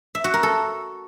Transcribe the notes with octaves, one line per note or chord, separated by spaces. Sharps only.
E5
F#4
A#4
A4